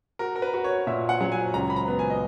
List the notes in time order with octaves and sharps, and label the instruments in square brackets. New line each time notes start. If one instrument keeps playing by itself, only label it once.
[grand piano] F#4 [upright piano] A#4
[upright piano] A#4
B4
[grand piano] F#4
[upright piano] C#5
[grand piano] A#2 [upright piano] E5
[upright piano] F#5
[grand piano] F#3 [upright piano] F#5
[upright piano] G#5
[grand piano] C#2 [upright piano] A#5
[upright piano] B5
A#5
[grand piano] B3
[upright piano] G#5
D#5